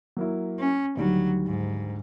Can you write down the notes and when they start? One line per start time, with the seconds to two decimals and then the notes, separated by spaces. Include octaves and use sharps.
0.17 F#3 A#3 E4
0.60 C#4
0.97 D2 D#3 F#3 G3
1.47 G#2